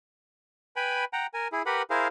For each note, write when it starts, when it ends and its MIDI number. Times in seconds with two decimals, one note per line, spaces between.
0.76 1.05 71
0.76 1.05 79
0.76 1.05 80
0.76 1.05 83
1.13 1.27 78
1.13 1.27 79
1.13 1.27 82
1.34 1.48 70
1.34 1.48 80
1.52 1.62 64
1.52 1.62 68
1.66 1.82 67
1.66 1.82 70
1.66 1.82 71
1.66 1.82 78
1.66 1.82 83
1.90 2.08 64
1.90 2.08 68
1.90 2.08 70
1.90 2.08 72
1.90 2.08 77